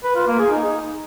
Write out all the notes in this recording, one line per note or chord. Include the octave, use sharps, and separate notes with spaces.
B4
F4
A#3
G#4
D#4